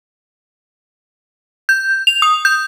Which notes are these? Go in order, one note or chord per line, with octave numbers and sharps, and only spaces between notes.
G6
F7
D#6
G6